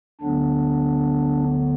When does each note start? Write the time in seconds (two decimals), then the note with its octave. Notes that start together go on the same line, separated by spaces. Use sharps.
0.21 D2 D3 F#3 B3 D4